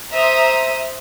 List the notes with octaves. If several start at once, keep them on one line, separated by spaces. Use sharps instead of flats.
C5 E5 A#5 D#6